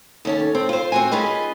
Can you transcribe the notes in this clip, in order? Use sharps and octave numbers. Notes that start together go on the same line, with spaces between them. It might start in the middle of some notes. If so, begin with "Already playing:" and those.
D#2 C#4 A4
C4
F4 C5
C4 F#4 G#5
C#4 F4 G#4 B4 D#5